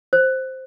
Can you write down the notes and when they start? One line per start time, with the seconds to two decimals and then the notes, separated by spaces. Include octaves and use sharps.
0.13 C5